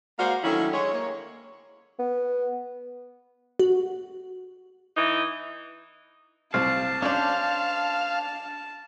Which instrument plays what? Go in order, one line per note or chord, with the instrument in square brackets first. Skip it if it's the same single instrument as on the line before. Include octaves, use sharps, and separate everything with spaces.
[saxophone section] G#3 A#3 F#4 C5 D5 F5
D3 D#3 F#3 A3 C#4 E4
G#3 C#5
A#3 C#5
[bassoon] B3
[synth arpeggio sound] F#4
[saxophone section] E3 D#4
[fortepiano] C2 C4 [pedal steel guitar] F5 [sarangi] A5
[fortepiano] C#4 D5 [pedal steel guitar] D4 C5 [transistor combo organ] F5